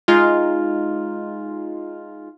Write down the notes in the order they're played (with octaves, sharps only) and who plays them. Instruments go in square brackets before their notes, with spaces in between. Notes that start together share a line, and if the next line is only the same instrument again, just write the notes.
[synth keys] G#3 D#4 F4